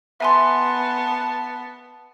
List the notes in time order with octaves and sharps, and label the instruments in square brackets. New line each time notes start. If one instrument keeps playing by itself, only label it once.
[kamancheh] B3 A5 [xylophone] E5 G#5 C6